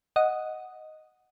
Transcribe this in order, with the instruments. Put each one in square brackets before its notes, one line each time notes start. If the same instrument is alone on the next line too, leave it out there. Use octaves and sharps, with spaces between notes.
[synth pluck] D#5 F#5 D#6